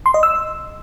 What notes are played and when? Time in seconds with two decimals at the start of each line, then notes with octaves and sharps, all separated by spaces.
0.06 C6
0.14 D#5
0.23 E6